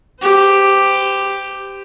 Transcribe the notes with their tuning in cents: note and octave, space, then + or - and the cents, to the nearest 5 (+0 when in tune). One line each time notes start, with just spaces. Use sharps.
G4 +5 C5 -30